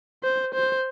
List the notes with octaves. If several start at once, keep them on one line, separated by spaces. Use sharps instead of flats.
C5
C5